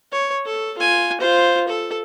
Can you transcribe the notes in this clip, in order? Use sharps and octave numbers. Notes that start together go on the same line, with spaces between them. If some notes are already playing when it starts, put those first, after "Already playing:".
C#5
A4
F4 G#5
F4 C5
A4